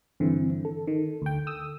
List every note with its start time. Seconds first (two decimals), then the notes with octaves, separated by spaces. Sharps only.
0.20 G2 D3 E3 C4
0.65 A4
0.87 D#3
1.22 D2 G5
1.47 D#6 E6